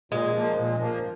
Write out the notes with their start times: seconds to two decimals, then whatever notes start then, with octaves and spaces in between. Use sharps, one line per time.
0.12 A#2 G#3
0.34 F3 A#3
0.58 A#2
0.81 F3 A#3